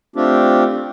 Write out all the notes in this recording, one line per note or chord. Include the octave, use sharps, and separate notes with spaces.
A3 C4 D4 F4 G4